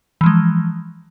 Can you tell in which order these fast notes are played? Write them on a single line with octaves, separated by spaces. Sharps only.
E3 F3 G#3